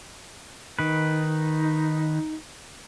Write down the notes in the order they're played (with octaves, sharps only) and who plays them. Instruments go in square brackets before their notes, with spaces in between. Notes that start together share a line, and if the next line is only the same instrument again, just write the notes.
[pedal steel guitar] D#3 B4 [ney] D#4